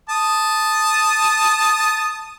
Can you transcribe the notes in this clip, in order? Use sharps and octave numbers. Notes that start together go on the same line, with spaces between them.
A5 D#6